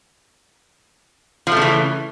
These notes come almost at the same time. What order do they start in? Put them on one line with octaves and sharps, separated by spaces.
F3 A3 C#3 E3